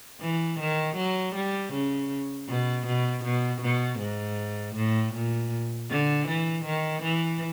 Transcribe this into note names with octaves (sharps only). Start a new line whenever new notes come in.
E3
D#3
F#3
G3
C#3
B2
B2
B2
B2
G#2
A2
A#2
D3
E3
D#3
E3